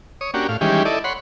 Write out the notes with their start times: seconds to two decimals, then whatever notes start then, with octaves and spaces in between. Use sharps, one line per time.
0.21 C#5 D#6
0.34 A#3 C#4 D4 F#4 G4
0.49 A2 F5
0.61 D#3 E3 G3 G#3 C#4 G4
0.85 E4 A4 D5 D#5
1.04 C#5 F#5 B5 C6